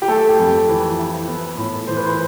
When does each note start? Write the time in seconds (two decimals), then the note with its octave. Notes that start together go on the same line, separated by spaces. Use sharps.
0.02 G4
0.08 A3 A4
0.29 G4
0.39 F2
0.48 A4
0.68 E3 B4
0.98 E4
1.28 B3
1.57 A2
1.87 E3 C5
1.97 B4
2.05 C5